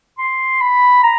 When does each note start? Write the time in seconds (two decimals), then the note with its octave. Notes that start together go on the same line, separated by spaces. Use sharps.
0.18 C6
0.61 B5
1.03 A#5